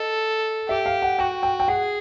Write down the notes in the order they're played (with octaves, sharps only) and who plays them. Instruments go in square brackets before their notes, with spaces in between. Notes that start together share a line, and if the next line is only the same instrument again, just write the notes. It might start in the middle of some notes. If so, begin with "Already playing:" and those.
Already playing: [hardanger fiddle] A4 [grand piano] D#5
[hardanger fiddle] G4 [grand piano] E5
[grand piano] F5
F#5
[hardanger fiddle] F#4 [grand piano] G5
[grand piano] G5
G5
[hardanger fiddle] G#4 [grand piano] F#5